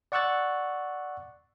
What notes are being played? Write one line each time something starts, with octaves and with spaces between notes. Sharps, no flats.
D5 F#5 C#6 E6 F#6 A6